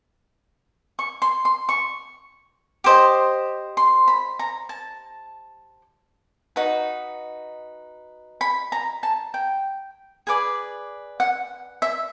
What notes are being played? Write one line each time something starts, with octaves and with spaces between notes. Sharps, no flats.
C#6
C6
C6
C#6
G4 C5 D#5
C6
B5
A#5
A5
D#4 F#4 B4
B5
A#5
A5
G5
G#4 B4 D5
F#5
E5